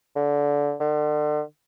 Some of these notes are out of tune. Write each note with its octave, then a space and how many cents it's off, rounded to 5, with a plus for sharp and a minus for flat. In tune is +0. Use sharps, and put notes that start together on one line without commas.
D3 -20
D3 +40